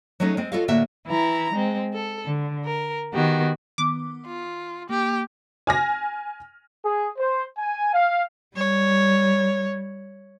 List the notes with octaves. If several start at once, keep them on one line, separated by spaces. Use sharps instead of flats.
F#3 G#3 A3 C#4 D#4
G#3 C4
F4 F#4 A4 C#5 D#5 F5
A2 D3 A#3 F#4 E5
E3 E4 A#5
G#3 C4
A4
D3
A#4
D#3 B3 F#4 G4
D#3 B3 D6
F4
A#3 G4
G#5 F6 A#6
G#4
C5
G#5
F5
G3 C#5